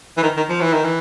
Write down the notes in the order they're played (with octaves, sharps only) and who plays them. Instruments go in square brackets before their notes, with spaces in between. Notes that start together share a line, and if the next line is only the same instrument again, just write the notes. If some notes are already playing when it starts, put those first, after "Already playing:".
[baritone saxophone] E3
D#3
D#3
F3
E3
D#3
E3